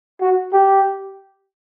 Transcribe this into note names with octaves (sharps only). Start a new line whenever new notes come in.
F#4
G4